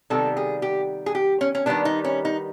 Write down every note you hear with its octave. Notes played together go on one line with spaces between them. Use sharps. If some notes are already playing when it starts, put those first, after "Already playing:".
C3 D#3 G3 B3 A4
G#4
G4
G#4
G4
C#4
C#4
D#3 G3 B3 D4
D#4
C#4
D#4